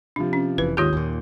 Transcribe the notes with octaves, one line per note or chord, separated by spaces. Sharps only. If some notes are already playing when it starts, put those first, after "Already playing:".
C3 F3 D4
C#4
F1 C2 E3 B4
D#2 G#2 D#3 F4 G4 D#6 G6
D#2 A#2